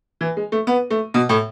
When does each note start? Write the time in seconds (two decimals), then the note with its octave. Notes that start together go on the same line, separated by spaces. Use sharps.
0.21 E3
0.37 G#3
0.52 A3
0.67 B3
0.90 A3
1.14 B2
1.29 A2